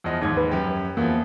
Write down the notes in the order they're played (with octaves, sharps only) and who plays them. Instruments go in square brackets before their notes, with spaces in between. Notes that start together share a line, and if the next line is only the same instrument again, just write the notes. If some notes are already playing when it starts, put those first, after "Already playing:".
[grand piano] E2 F3 D#5
D#2 G#2 G#6
[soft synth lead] B4
[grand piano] F#2 G4
[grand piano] E2 F3 [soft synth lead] A#3